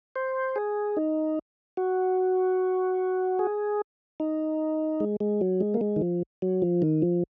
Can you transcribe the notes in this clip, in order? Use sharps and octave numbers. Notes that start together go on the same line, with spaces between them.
C5
G#4
D#4
F#4
G#4
D#4
G#3
G#3
F#3
G#3
A#3
G#3
D#3
F3
F#3
F3
D#3
F3